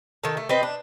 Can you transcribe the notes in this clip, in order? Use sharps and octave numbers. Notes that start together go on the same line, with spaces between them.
D#3 A4
A3
C4 B4 D#5
D4